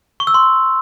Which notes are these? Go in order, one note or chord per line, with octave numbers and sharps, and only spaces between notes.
C#6
E6
C6